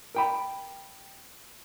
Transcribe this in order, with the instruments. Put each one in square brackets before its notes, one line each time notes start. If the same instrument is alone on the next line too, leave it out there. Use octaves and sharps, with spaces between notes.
[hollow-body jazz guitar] A#4 G5 B5